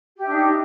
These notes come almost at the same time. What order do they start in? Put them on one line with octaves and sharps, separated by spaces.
G4 E5 D4 D#4